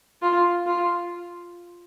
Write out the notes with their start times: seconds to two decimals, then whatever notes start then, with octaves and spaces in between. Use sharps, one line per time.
0.22 F4
0.66 F4